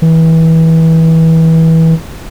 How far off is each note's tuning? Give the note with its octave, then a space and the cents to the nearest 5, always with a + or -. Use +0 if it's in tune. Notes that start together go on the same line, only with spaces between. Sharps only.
E3 -25